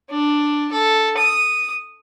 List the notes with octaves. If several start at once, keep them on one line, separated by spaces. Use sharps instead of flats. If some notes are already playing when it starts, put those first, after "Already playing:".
D4
A4
D#6